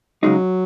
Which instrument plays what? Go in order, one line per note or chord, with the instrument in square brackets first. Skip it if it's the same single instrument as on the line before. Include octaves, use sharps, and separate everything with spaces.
[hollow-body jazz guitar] C#3 G#3 D#4 [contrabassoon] F#3